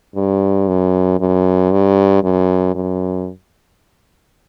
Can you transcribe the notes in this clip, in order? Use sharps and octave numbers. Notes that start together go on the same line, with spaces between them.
G2
F#2
F#2
G2
F#2
F#2